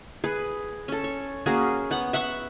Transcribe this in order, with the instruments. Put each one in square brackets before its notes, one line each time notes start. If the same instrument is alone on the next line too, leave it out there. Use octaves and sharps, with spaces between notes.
[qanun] G#4 B4
C#4 A4
C#5
A#3 C#4 F#4 G#4
B3 F#5
E5 F#5 B5 C#6